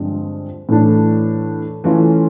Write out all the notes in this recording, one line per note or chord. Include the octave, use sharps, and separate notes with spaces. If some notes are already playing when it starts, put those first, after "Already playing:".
Already playing: G2 D3 F3 G#3 C4
A2 E3 A3 D4
E3 A3 C#4 F4